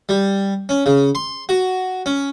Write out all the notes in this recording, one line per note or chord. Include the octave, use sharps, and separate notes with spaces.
G3
C#4
C#3
C6
F#4
C#4